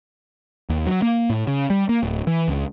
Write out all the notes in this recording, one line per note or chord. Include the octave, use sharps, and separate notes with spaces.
D#2
F#3
A#3
A2
C#3
G3
A#3
D1
E3
C#2